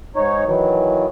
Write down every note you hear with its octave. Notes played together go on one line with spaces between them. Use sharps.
G#2 D#4 C#5
D#3 E3 F#3